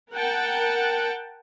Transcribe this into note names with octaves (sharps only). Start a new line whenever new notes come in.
A#4 F#5 G5 A5